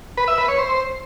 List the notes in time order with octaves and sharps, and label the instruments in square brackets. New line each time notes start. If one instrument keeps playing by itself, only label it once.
[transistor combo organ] B4
E5
B4
C#5
C5